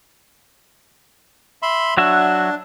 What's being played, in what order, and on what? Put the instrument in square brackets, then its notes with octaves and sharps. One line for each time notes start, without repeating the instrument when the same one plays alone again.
[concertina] E5 B5 C6
[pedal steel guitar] F#3 F#4 E5 [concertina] D4